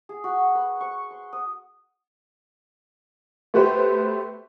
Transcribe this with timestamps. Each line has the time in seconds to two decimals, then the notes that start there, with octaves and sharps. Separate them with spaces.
0.09 G#4
0.24 F#4
0.55 B4
0.81 C#6
1.11 C6
1.33 D#6
3.54 A3 B3 F#4 G4 B4 C5